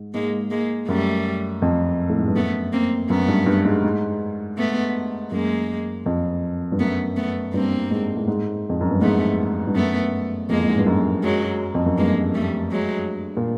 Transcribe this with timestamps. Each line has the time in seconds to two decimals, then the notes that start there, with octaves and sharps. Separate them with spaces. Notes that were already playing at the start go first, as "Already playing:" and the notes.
Already playing: G#2
0.14 G#2 G#3 A#3
0.50 G#3 A#3
0.88 F#2 G3 A3
1.62 F2
2.10 A2
2.18 G#2
2.28 G2
2.36 F#2 A3 B3
2.72 A#3 C4
3.10 F#2 A3 B3
3.28 G2
3.46 G2
3.65 G#2
3.84 G#2
4.57 A3 B3
5.31 F#2 G#3 A#3
6.06 F2
6.72 G2
6.79 F#2 A3 B3
7.16 A3 B3
7.54 G2 A#3 C4
7.91 G#2
8.17 A2
8.28 G#2
8.69 F2
8.81 F#2
8.91 G2
9.01 G#2 A3 B3
9.67 G2
9.75 F#2 A3 B3
10.49 F2 G#3 A#3
10.60 A2
10.68 G#2
10.78 G2
10.86 F#2
11.23 F#3 G#3
11.74 F2
11.86 F#2
11.98 G2 G#3 A#3
12.34 G3 A3
12.71 F#3 G#3
13.37 A#2